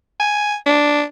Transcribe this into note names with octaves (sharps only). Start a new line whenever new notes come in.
G#5
D4